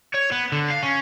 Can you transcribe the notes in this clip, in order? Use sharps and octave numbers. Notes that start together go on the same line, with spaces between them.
C#5
B3
D3
F5
C#4